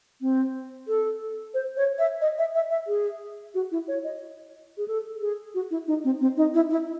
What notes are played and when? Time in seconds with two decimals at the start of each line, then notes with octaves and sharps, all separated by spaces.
0.21 C4
0.88 A4
1.54 C5
1.77 C#5
1.99 E5
2.21 D#5
2.38 E5
2.55 E5
2.71 E5
2.87 G#4
3.54 F#4
3.72 E4
3.88 C#5
4.04 D#5
4.78 G#4
4.88 A4
5.21 G#4
5.54 F#4
5.71 E4
5.87 D#4
6.04 C4
6.21 C4
6.37 D#4
6.54 E4
6.71 E4